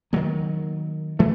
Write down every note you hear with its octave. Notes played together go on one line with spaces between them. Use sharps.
D#3 F#3 A#3
E3 A3